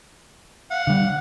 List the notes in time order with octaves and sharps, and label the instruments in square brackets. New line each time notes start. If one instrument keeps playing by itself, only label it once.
[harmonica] F5 F#5
[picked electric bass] D3 G3